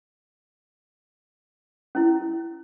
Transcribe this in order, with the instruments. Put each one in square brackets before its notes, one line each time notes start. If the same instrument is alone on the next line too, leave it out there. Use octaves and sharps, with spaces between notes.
[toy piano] C#4 E4